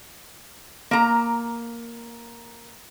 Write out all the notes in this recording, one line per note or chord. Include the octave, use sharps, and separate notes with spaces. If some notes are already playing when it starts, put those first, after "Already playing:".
A#3 A#5